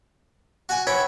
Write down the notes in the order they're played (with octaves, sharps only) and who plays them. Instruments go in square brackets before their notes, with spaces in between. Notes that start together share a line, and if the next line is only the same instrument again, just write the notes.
[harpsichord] F#4 F#5 G#5
[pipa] C#5 [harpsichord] E5 G5 B5